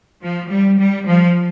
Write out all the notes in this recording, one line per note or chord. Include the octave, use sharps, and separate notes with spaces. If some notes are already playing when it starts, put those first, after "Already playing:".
F3
G3
G3
F3